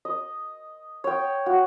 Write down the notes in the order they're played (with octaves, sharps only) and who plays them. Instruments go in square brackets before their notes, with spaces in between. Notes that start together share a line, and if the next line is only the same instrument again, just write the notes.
[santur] D#5
C#5 G5
F#4